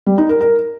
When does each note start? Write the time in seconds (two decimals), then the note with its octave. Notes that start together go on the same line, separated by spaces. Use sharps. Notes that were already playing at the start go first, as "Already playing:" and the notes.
0.06 G3
0.18 D#4
0.29 A#4
0.41 A#4